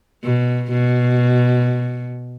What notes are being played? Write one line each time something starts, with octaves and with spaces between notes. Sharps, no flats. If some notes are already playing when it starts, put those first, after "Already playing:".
B2
B2